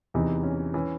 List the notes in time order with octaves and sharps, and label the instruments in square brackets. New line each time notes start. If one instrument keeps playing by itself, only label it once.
[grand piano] E2 C3 E3 D#4
C#4
E3 C#4